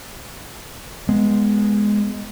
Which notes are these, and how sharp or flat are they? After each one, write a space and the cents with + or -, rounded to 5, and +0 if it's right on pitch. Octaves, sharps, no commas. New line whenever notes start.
G#3 +0 B3 +0